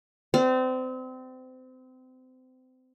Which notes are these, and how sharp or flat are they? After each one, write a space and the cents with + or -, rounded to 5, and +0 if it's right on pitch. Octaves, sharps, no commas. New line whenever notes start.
C4 -30 D5 +0